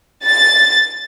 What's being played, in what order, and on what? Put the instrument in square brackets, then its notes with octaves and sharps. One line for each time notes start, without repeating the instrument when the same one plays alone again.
[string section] A6